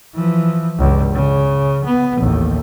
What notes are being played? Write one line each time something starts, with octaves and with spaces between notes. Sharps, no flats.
E3 F3
C#2 G2
C#3
B3
A1 D#2